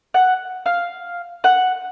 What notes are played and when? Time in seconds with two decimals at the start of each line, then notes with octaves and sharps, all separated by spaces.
0.14 F#5
0.66 F5
1.44 F#5